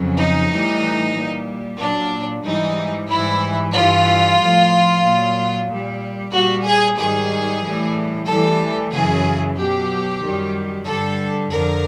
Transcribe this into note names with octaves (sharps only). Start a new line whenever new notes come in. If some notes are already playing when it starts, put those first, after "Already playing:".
Already playing: F2 C#3 F#3
D#4
A2 E3 G3
A#2 G3
A#2 F#3 D4
G#2 E3 G3 D#4
G#2 E3 G3 E4
G2 E3 G3 F4
A2 F3
A#2 F#3
A#2 G3
A#2 G3 F#4
G#4
G#2 D#3 G3 G#4
A2 E3 G3
A2 E3 G3 A4
F#2 C#3 E3 G#4
B2 F#3 G4
F#2 D#3 G3
G2 D3 G3 A4
F2 D3 F3 A#4